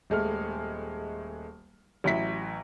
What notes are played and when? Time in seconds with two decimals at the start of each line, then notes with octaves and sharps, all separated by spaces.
0.10 D#1 G#3 A3 F6
2.04 A1 F#3 E4 B6